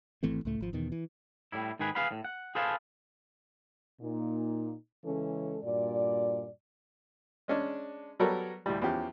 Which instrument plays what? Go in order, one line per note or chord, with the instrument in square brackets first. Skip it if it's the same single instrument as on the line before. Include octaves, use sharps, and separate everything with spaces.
[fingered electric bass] G#1 E3 A3 C4
C#2 A2 A3
G#1 F3
E2 B2 D#3
E3
[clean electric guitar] A2 G3 E4
G#2 D#3 G#4 B4
G#4 B4 F5 F#5 B5
A2
F#5
G#4 A4 B4 C5 F5 A5
[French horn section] A#2 A#3 D#4
C#3 E3 G#3 C#4 A4
G2 A#2 F#4 D5
[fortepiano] G#3 C#4 D4
F#3 G3 B3 A4 A#4 C#5
D2 A2 G3
E2 F3 C#4 G4